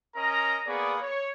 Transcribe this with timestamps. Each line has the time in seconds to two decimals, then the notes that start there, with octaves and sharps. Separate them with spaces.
0.16 C#4 A#4 D#5 A#5
0.67 A#3 B3 G#4 B4 D5 C#6
1.02 C#5